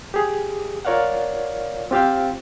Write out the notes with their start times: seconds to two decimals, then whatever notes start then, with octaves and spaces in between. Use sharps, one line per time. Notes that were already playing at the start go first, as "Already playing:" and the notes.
0.14 G4 G#4
0.85 F4 A#4 C#5 D5 F5 F#5
1.91 C4 F4 G4 C5 F5 G5